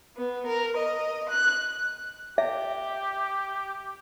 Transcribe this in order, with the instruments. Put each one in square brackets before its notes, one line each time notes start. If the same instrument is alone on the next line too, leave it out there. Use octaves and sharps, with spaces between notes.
[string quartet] B3
A#4
D#5
F#6
[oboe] G4 [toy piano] E5